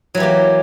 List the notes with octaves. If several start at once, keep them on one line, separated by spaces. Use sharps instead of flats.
E3 F#3 A#3 G4